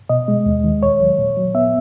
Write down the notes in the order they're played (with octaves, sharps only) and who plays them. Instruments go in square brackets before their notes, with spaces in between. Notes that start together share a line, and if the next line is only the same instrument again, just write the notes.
[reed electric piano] B2 D#5
G#3
D#2
D#3
A#2 C#5
F#3
A#2
F#3
B3 E5